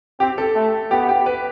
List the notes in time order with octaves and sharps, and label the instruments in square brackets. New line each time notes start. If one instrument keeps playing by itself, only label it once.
[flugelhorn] C4 [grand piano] G4
[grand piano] A4
[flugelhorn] A3
[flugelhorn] B3 [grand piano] G4
[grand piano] G4
B4